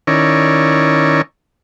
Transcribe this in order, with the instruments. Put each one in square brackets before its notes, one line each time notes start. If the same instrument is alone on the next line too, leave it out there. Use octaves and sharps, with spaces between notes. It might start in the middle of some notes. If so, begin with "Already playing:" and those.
[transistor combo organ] D#3 C#4 E4 A#4 C#5 D5